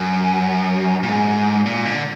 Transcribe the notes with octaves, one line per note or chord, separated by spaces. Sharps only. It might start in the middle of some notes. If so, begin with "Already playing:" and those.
Already playing: F#2
A#2
G#2
A#2
D3